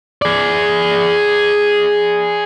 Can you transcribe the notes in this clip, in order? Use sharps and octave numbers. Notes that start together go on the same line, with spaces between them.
G#4 D5